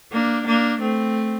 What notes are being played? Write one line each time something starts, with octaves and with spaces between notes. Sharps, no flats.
A#3 D4
A#3 D4
A3 C4